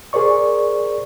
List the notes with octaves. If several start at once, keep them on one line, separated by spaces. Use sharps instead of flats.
G#4 A#4 C5 D5 C#6